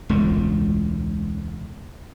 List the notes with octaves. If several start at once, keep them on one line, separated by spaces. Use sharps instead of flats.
E1 C#2 A2